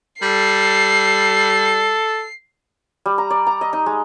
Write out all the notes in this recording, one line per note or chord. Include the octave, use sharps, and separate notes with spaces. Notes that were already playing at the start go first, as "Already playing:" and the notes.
G3 A4 C7
G3
A#5
D5
A#5
D#5
D#4
G#3